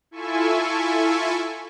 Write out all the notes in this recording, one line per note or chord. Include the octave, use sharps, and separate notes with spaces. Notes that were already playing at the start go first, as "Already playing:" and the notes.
E4 F4 A4 E5 G#5 C#6